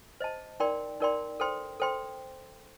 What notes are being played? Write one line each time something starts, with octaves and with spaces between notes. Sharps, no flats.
C5 D#5 A5
D#4 A#4 D5 G5 C6
D#4 A#4 D5 G5 C6
A4 C5 G5 C6
A4 C5 G5 C6